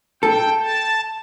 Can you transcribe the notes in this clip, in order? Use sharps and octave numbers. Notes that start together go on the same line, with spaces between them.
A4 G5
A5